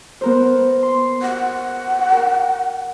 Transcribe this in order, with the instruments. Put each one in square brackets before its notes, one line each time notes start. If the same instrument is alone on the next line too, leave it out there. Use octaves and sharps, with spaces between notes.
[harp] B3 A#4 C5
C6
[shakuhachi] F#5
[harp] A#4